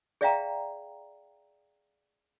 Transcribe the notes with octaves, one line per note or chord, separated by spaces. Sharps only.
G#4 D5 E5 F5 G5 A#5